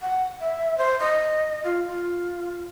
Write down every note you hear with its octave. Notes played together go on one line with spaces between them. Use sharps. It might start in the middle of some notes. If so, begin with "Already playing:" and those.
F#5
E5
C5
D#5
F4
F4